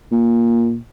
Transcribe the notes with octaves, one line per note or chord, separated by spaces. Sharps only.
A#2